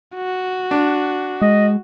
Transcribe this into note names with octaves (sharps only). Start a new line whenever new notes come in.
F#4
D4
G#3 D#5